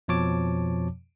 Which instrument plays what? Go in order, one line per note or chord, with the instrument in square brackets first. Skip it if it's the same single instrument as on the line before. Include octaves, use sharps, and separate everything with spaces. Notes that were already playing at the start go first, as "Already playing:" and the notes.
[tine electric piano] F2 B2 F3 C#5 A5 D6